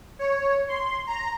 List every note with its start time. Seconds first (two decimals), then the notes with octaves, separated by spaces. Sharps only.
0.19 C#5
0.68 C6
1.07 A#5